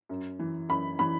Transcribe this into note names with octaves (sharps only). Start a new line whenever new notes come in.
F#2
E3
F#2 B5
E3 B5